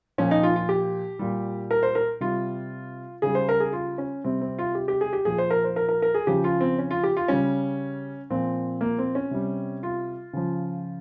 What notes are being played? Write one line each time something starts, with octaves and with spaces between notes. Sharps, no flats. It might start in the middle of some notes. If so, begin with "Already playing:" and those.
A#2 F3 C#4
D#4
F4
F4
G4
A#2 G3
A#4
C5
A#4
C3 G3 F4
C#3 G3 G#4
C5
A#4
G#4
F4
C#4
C3 G3 C4
C4
F4
G4
G4
G#4
G4
A#2 F3 G#4
C5
A#4
C5
A#4
A#4
A#4
G#4
C#3 F3 G4
F4
C4
C#4
F4
G4
F4
C#3 G3 C#4
A#2 F3 C4
A#3
C4
C#4
C3 G3
F4
C#3 F3